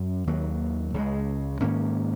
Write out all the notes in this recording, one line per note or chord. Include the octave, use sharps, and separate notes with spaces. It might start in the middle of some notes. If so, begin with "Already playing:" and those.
Already playing: F#2 C#4
D#2 D#3 F#3 A#3
C#2 C#3 G#3
G#2 D#3 A#3 C#4